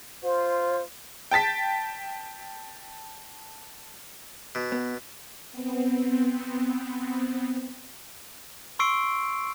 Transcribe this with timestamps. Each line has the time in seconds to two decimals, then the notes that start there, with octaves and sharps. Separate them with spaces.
0.23 F4 C5
1.31 G5 A5 A6 B6
4.55 B2
4.72 B3
5.51 B3 C4
8.79 C6 C#6 E6 C7 D7